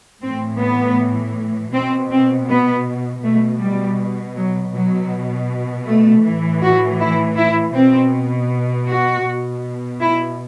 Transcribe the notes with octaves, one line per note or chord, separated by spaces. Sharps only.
A2 E3 C4
B3
B2 C4
C4
B3
B2 A3
G3
F#3
B2 F#3
A3
A2 E3
F#4
E4
E4
B2 C4
F#4
B2
E4